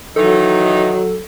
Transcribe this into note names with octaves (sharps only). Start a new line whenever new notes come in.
D#3 E3 F#3 D#4 A4